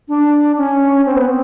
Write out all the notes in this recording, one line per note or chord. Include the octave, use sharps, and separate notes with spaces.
D4
C#4
C4
B3
C4